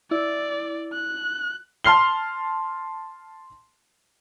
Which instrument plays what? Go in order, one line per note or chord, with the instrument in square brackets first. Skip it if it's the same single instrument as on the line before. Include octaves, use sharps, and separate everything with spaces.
[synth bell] E4 [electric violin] D5
[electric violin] F#6
[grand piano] A5 C6 F6 C7 G7